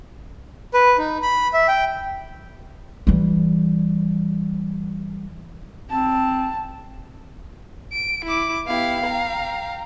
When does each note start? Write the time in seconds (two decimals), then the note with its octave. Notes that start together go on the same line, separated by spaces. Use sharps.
0.74 B4
0.98 D#4
1.23 B5
1.53 E5
1.68 G5
3.07 E3 G3
5.90 C4 A5
7.92 D7
8.25 E4 D6
8.67 B3 E4 G4 F5
9.05 G5 A#5